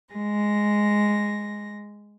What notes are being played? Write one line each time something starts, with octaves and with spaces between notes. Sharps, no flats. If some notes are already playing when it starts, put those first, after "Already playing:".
G#3 A#6